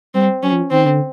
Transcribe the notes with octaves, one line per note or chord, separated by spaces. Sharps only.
G3 C4
F#3 C#4
F3
D#3 C4
D3